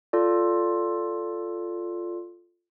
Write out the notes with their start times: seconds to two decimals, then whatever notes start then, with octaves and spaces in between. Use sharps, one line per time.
0.13 F4 A4 D5